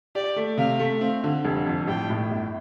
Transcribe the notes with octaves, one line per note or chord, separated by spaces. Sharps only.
G4 D5
A3
C3 F5
A3
C4 F5
D3
F1
F2
A1 G5
A2
G1